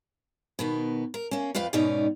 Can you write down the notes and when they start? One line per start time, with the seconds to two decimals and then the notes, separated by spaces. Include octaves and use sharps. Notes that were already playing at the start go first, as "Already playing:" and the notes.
0.59 B2 D#3 B3
1.14 A#4
1.31 A#3 C#4
1.55 F2 F4 B4 F5 G5
1.73 G#2 B2 B3 C#4 D#4 D5